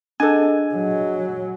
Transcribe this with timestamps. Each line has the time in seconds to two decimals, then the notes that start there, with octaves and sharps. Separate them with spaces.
0.20 D4 G#4 A4 D#5 F#5 G#5
0.75 F#3